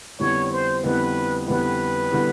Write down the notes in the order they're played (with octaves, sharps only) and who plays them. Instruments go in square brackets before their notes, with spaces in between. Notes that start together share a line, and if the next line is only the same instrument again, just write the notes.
[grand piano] F2 D3 G3 B3 E4 [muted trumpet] C#5
[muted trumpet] C5
[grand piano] F2 D3 G3 B3 E4 [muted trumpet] B4
[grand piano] F2 D3 G3 B3 E4 [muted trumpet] B4
[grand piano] D3 G3 B3 E4